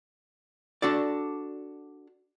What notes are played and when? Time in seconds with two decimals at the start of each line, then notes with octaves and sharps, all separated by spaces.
0.82 D4 F#4 A4 D5